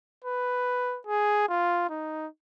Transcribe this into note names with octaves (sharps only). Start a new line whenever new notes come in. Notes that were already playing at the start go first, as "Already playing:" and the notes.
B4
G#4
F4
D#4